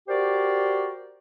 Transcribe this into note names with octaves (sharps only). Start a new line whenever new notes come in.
F#4 G4 A#4 C5 D5